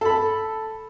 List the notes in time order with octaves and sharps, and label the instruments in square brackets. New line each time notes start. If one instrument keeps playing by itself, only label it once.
[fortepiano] A4 B5